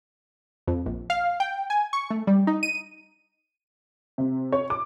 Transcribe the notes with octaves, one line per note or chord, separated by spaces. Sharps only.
F2
A#1
F5
G5
G#5
C#6
A3
G3
D#4
D#7
C3
C#5
D6